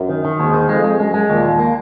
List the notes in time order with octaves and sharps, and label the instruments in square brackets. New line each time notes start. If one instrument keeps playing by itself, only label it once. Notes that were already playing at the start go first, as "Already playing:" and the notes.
Already playing: [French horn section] F#2
[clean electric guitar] D#3
D#3
[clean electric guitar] D#2 [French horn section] G#2
[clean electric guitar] D#3
[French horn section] F2 [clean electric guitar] G#3
[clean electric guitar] G#3
[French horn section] F#2 [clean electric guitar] G#3
[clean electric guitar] G#3
[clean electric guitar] D#2 [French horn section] A#2
[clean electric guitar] D#2
A#3